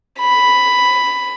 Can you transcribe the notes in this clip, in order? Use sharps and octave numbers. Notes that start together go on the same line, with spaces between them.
B5